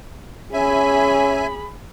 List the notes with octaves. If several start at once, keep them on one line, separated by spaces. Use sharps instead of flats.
C#4 G#4 E5 G#5 B5